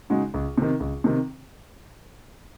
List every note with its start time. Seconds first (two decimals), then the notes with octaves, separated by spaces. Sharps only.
0.10 C#3 G#3 D#4 F#4
0.34 C#2
0.58 C3 D#3
0.80 C#2
1.04 C3 D#3